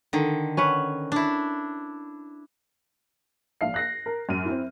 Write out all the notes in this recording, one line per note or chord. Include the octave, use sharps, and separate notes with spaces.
D3 D#3
C#4 B4 F#5
D4 E4
A#1 F5 C7
F#6 A#6 C7
A#4
F#2 F6 D#7
C4 E4